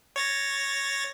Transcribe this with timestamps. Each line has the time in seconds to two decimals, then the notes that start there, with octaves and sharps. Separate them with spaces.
0.16 C#5 A6 A#6